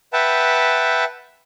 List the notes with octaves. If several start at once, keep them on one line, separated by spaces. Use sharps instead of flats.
B4 E5 F#5 G5 A5